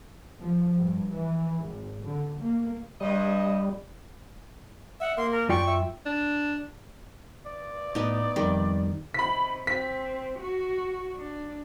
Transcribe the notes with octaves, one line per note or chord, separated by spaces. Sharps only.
F3
G2
E3
G#1
D3
A#3
G2 G3 D#5
E5 F#5
A#3 C6
A#4
F#2 F4 D5 G5 C#6
E5
D4
D5
A2 B3 D#4
F2 D#3 G3
C3 D#3 B5 B6
C4 B6
F#4
D4